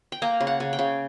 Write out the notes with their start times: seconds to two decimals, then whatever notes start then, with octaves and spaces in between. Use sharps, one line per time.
0.12 G5
0.22 A#3 A#5
0.40 C#3
0.47 F#5
0.60 C#3
0.73 G5
0.79 C#3